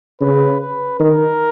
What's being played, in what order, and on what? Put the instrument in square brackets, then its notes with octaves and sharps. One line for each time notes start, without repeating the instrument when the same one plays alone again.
[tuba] C#3 [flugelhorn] B4
[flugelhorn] B4
[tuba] D#3 [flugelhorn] A#4